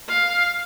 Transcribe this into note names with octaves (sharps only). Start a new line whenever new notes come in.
F5